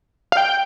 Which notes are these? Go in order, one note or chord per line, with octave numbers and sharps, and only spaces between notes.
F5
G5